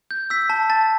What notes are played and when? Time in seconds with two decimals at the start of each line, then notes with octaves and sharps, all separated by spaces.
0.11 G6
0.30 E6 B6
0.50 A5
0.70 A5 A6